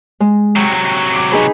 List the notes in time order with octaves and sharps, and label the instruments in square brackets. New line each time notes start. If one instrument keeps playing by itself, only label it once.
[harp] G#3
[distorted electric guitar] C3 F#3 [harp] G5
[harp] D6
D#4 G#4 B4